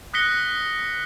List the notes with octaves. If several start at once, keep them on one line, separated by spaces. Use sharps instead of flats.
D#6 F#6 A#6 B6 C#7 G7